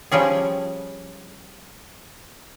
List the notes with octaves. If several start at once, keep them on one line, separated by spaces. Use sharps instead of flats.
F3 G3 C#4 G#4